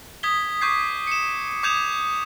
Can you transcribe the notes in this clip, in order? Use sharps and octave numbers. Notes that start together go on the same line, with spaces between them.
D#6 G#6 B6 G7
C#6 D6 G6 G#6 C7
C#7 E7
D6 D#6 G6 G#6 E7 F7